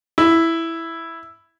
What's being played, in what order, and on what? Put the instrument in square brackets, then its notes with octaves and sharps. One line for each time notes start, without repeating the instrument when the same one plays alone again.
[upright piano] E4